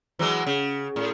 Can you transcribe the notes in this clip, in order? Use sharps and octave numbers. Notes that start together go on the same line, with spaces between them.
E3 F#3 G#3
C#3
A2